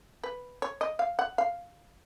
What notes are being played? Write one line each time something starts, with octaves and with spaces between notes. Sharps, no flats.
B4
C#5
D#5
F5
F#5
F5